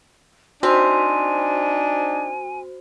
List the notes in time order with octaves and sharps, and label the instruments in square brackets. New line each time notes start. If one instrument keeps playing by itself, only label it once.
[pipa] C4 [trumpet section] D4 D#4 [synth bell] F#4 C5 [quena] G#5